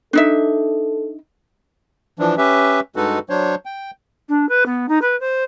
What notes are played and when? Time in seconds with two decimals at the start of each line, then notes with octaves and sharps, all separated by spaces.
0.13 D4 D#4 A4 E5
2.19 E3 F3 D4
2.38 C#4 G4 B4 E5
2.96 G2 G#3 D#4 F#4 A4 B4
3.30 F#3 D4 C5 C#5
3.66 G5
4.29 D4
4.49 B4
4.66 B3
4.88 D#4
5.01 B4
5.20 C5